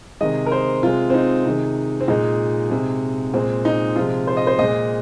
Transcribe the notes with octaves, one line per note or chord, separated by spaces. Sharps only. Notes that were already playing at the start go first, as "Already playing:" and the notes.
C3 D#3 G#3 D#5
A#4
C5
C3 G#3 F4
C4
D#4
C3 D#3 G#3
C4
A#2 G#3 D#4
C3 G#3
A#2 G#3 C4
D#4
C3 F3 G#3 F4
C5
D#5
C5
A#2 G#3 D#5